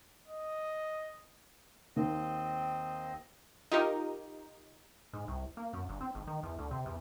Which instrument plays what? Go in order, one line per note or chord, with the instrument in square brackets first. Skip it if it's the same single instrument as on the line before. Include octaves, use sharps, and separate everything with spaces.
[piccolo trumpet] D#5
[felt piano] D#2 [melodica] C4 D#5
[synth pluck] D#4 F4 G4 A#4 D#5
[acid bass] G#2
C2
A#3
F#2
G1
C4
G#1
D#3
E2
D2
C3
E2